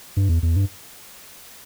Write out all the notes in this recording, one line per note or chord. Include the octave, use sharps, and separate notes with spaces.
G2
E2
E2
G2